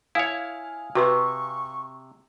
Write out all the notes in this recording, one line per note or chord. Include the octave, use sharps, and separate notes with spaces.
E4 C#5 F5 G#5 D#6
C3 F#4 B4 C6 C#6